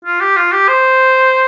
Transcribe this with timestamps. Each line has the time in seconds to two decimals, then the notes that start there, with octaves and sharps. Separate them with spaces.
0.05 F4
0.20 G4
0.37 F4
0.52 G4
0.68 C5